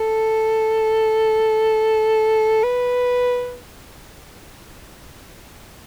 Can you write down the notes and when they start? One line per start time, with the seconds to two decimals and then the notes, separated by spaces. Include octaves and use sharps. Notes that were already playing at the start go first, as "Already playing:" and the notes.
Already playing: A4
2.63 B4